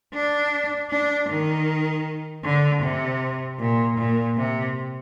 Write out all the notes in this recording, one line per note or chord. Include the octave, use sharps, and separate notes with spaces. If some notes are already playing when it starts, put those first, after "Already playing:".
D4
D4
D#3
D3
C3
A#2
A#2
C3